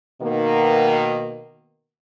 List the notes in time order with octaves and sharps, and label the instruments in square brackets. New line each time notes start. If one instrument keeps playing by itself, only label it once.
[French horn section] B2 D#3 A#3